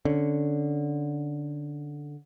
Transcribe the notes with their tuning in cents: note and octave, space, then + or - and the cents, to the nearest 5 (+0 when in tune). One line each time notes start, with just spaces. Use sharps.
D3 +0 C#4 +0